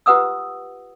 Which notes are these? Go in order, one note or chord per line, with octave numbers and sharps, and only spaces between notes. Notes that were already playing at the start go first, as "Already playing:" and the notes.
F4 G4 B4 F#5 D#6 E6